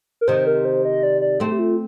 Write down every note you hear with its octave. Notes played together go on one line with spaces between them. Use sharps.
A#4
C3 D#3 C5
A#4
C5
D#5
D5
D5
A3 C4
G4
F4